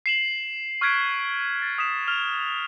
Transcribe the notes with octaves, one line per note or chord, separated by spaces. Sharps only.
C7 E7 F#7
C#6 F6 F#6 G#6 B6 D7
A6
D#6 B6 E7
F6 F7 G7